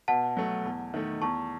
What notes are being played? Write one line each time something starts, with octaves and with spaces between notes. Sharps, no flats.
B2 F#5 A5
F#3 A3
E2
D#3 A3
E2 A5 C#6